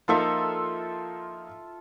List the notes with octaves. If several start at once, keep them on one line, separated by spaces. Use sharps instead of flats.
F3 A#3 D#4 F4 A4 E5